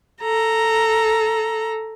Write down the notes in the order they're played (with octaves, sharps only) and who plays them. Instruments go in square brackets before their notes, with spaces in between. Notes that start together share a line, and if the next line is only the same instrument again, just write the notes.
[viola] A4 A#5